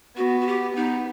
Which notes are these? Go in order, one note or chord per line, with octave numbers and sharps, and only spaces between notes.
B3 F#4
F#4
G4
B3 D#4